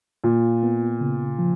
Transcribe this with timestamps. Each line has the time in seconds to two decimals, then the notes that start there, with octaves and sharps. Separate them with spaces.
0.24 A#2 F4
0.63 B3
1.01 C#3
1.39 F3